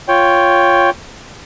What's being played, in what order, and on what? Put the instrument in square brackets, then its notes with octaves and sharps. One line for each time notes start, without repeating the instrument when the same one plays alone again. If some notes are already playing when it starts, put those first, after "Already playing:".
[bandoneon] F4 C#5 G5